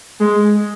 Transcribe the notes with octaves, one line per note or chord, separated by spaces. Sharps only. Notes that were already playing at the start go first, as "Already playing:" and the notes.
G#3